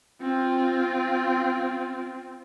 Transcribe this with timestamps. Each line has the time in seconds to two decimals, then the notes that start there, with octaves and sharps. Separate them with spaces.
0.22 C4 F4